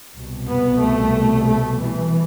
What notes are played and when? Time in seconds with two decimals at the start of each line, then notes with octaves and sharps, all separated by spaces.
0.15 C2 B2
0.48 B3
0.81 A3
1.46 A3
1.79 E3